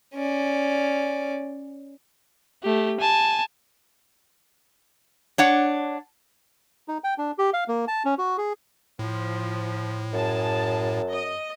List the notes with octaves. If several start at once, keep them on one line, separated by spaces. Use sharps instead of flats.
C#4 D5
A3 G4
G#5 A5
D4 C#5 F#5
D#4
G5
D4
G4
F5
A#3
A5
C#4
F#4
G#4
A2 F3
F#2 G#4 A5
D#5